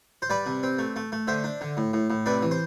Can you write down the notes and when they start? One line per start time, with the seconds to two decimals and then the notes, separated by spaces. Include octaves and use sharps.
0.22 C5
0.30 G3 B4 D5
0.46 C3
0.63 C4
0.78 A3
0.96 A3
1.12 A3
1.27 D3 C5 E5
1.44 D4
1.61 D3
1.77 A2
1.93 A2
2.10 A2
2.26 C3 B4 D5
2.42 E3
2.51 C5